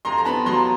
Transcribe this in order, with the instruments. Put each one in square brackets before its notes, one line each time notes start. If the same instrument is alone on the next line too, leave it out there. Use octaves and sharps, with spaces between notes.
[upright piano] F2 A#5 C6
A#5
B3 A5 B5
F#3 A#5 C6